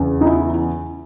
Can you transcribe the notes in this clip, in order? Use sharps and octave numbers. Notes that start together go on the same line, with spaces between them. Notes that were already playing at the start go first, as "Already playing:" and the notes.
Already playing: E2 C#3
D#4
E4